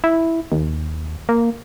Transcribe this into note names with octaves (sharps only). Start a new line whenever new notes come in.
E4
D#2
A#3